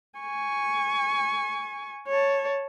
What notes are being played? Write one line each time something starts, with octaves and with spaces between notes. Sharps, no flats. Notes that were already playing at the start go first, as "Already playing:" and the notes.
G#5 C#6
C#5 A5